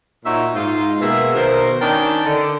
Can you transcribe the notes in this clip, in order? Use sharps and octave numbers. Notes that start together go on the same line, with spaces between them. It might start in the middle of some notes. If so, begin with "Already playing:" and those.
A#2 D#4 F#4 C#5 E5
G#2 D#4 F4
B2 A#3 B3 G#4 E5
B2 D#3 A#4 C5
D#3 C#4 D4 D#5 G5 A5
D3